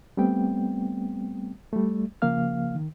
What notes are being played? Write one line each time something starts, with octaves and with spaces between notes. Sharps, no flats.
G3 A3 B3 C4 G5
G3 A3
C#3 F3 A#3 F5 F6
D#3